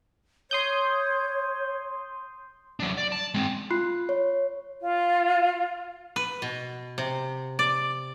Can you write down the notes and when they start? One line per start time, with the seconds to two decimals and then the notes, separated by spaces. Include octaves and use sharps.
0.51 C#5 C6 D#6 G6
2.80 F#3 D4
2.98 D5
3.12 A5
3.34 G#3 C4
3.71 F4 B5 C6 F#6 C7
4.09 C#5
4.82 F4
6.16 B4
6.42 B2
6.98 C3
7.59 D5